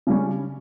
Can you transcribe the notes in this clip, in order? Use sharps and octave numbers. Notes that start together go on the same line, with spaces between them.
C#3 G3 C#4